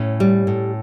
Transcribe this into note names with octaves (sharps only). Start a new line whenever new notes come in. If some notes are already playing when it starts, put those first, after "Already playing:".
Already playing: A2 C#4
G3
A2